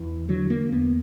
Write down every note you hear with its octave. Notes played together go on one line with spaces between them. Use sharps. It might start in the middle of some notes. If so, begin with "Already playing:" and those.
Already playing: E2 E3
D3 F#3
A#3
E2 B3